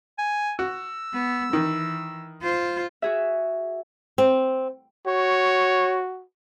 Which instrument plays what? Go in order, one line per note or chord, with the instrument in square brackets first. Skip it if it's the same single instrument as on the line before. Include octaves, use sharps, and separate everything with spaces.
[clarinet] G#5
[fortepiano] F#4 [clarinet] E6
[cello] B3
[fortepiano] D#3 [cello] E3
[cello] F4 C5
[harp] F#4 G#4 E5
[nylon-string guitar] C4
[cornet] F#4 [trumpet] C#5